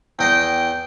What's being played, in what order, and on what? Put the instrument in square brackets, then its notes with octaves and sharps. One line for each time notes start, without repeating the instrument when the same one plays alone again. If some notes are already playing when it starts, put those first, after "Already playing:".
[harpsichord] E2 D#5 C6 [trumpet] G5